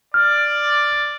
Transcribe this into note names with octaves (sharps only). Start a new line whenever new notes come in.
D5 F6